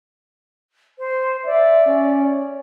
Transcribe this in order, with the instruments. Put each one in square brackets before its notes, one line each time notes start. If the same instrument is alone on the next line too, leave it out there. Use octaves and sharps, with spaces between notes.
[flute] C5
[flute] D5 [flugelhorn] E5
[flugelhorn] C#4